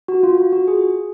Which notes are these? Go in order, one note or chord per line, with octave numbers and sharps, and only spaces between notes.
F#4
F4
F4
F#4
G#4